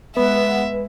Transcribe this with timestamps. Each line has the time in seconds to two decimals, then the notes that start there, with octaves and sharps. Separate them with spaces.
0.17 G#3 B3 B4 E5